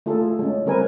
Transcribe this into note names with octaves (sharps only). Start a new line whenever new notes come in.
A3 F4 G#4 A4
G#3 C#4
G3 C4 A#4 B4 G#5